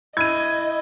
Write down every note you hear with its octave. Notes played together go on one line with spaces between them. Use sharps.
E4 D#5 G#6 D#7